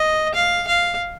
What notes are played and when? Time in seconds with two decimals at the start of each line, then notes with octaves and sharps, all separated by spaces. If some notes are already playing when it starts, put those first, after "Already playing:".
Already playing: D#5
0.34 F5
0.67 F5